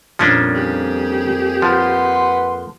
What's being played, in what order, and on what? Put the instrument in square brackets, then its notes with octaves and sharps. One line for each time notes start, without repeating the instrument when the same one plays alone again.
[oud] F2 A#2 G3 [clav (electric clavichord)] F3 C#4 D4
[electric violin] G4 G#4
[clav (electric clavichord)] F3 [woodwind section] B4 F#5 C6